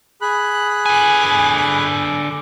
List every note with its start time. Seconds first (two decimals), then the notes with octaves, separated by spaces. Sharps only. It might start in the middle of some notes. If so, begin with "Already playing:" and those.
0.21 G#4 B5 F#6
0.86 D3 G#5